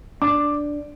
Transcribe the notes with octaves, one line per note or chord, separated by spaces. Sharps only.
D4 D6